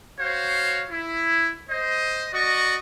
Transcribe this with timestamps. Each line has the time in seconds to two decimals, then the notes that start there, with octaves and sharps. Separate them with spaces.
0.20 F#4 C5 C#5 F5
0.90 E4
1.70 C5 D#5
2.33 F#4 D5 D#5 C#6